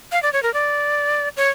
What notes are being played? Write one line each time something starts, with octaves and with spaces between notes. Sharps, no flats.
F5
D5
C#5
A#4
D5
C#5